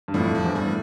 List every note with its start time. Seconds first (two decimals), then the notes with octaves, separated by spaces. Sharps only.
0.08 G2
0.14 F2 A2 G3
0.35 F3
0.45 E2 G2
0.55 G3
0.66 A2